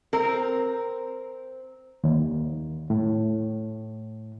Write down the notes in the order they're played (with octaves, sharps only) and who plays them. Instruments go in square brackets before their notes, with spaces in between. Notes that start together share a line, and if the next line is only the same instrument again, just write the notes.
[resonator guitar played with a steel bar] C4 A#4
[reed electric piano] D#2
A2